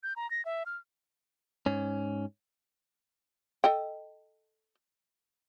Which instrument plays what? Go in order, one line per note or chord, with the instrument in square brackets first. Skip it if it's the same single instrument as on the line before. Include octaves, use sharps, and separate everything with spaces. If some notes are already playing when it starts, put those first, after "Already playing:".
[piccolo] G6
A#5
A#6
E5
F6
[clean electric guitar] G#2 C#4
[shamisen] A4 D#5 G5